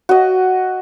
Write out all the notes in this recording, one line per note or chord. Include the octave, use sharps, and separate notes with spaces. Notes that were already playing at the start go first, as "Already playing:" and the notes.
F#4 D#5